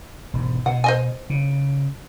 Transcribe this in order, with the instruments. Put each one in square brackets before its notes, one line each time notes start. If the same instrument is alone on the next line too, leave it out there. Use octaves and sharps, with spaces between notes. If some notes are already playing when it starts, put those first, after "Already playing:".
[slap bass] E1 G#2
[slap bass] B2 [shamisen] F#5
[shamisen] C5 D#5 G#5
[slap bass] C#3